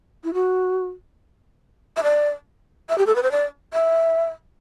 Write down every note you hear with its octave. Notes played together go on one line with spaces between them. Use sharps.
E4
F#4
E5
D5
E5
G4
A4
B4
C5
D5
E5